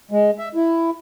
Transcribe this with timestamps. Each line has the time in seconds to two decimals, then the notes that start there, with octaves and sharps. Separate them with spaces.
0.11 G#3
0.38 E5
0.55 E4